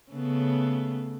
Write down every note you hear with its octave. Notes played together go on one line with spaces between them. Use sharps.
C#3 A3 B3